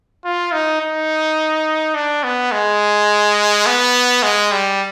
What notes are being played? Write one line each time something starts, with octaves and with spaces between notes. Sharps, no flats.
F4
D#4
D#4
D4
B3
G#3
B3
G#3
G3